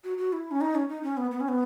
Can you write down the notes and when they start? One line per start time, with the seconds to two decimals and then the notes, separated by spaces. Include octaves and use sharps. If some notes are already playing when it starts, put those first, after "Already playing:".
0.04 F#4
0.18 F#4
0.33 E4
0.51 C#4
0.61 D#4
0.75 C#4
0.89 D#4
1.03 C#4
1.17 B3
1.31 B3
1.40 C#4
1.48 B3